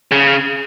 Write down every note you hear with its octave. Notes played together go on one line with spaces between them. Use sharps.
C#3